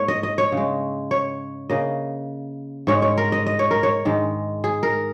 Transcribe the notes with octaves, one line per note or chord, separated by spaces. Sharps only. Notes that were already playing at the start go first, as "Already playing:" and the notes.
Already playing: G#2 A#3 C#5
D#5
D#5
C#5
C#3 G#3
C#5
C#3 A#3 D#5
G#2 G#3 C#5
C#5
A#4
D#5
D#5
C#5
A#4
C#5
G#2 D#3 G#3
G#4
A#4